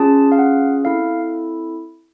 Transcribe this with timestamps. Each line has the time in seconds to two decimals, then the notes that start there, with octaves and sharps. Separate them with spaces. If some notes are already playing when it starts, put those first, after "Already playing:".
Already playing: C#4 F4 G#4 A5
0.32 F5
0.39 F#5
0.84 C4 E4 A4 F5